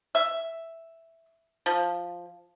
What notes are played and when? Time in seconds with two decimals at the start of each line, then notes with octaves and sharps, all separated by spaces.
0.15 E5
1.66 F3